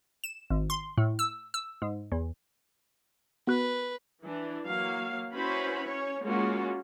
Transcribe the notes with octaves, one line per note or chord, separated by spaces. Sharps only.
E7
G#1
C6
A2
E6
E6
G#2
E2
B3 F#4 B4 F#6
E3 D4
F#3 A#3 F5
C#4 E4 F#4 B4 C5 B5
C#4 C#5
G#3 A#3 C#4 F4 F#4